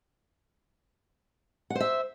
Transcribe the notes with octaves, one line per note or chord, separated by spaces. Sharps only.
C5 E5 F#5